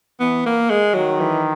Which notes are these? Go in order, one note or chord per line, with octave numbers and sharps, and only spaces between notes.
E3 B3
A#3
G#3
D#3 F#3
E3